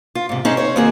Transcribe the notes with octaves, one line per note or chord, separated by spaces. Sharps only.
F4
G#2 C3
C4 C#4 D#4 G#4
C5 C#5
D#2 A#3 C4 F#4 G#4